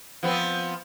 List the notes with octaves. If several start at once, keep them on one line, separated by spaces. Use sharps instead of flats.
F3 B3 C4